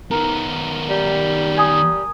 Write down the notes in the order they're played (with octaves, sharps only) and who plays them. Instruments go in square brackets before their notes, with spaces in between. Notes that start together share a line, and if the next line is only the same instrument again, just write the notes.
[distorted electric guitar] D#3 B3 [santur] A#4
[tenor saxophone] G3
[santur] G#5 D#6